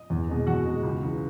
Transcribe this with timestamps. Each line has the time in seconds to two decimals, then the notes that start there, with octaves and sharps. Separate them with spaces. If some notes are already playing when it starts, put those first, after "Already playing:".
Already playing: D#5
0.10 E2
0.29 B2 G#3
0.47 E2 F#4 F#5
0.66 B2 G#3
0.83 C#2
1.02 C#3 E3